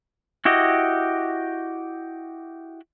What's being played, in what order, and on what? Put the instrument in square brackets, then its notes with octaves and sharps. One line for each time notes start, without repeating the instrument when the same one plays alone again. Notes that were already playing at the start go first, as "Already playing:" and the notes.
[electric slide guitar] E4 F#4 G4 D#5